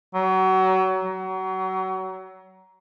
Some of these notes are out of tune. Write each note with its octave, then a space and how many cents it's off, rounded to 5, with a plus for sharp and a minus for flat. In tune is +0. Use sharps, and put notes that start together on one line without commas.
F#3 +30
F#3 +30